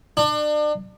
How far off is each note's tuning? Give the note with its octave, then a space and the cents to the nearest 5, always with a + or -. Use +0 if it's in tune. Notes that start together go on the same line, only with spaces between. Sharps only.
D4 +35